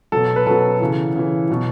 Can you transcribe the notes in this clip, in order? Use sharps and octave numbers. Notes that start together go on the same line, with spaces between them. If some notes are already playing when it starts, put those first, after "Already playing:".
B2 F#3 A4
B4
B2 F#3 A4
C#3 E3
C#3 E3
B2 F#3